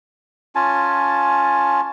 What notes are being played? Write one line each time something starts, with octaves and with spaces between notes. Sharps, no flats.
C#4 F4 G#5 A5